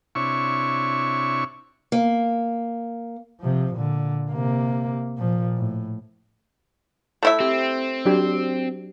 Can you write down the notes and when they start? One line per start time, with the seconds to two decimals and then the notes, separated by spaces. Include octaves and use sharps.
0.15 C3 D4 E4 C#5 C#6
1.92 A#3
3.41 C3 F3
3.75 A#2 D3
4.31 C3 A#3
5.18 A#2 F3
5.58 A2
7.23 A3 E4 E5
7.40 C4 G4
8.05 F#3 D4 G4